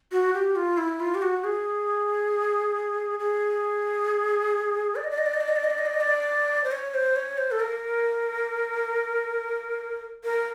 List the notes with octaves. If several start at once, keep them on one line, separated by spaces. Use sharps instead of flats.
F#4
G4
F4
E4
F4
G4
F#4
G#4
G#4
D5
D#5
D5
D#5
D5
D#5
D5
D#5
D5
D#5
D5
D#5
D5
D#5
D5
C5
C#5
C5
C#5
C5
A4
A#4
A#4